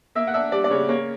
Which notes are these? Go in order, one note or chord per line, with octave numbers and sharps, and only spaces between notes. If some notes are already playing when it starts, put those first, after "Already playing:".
A#3 E5
F#5
D4 E5
G3 D5
D5
C#3 C#5
A#3 C#5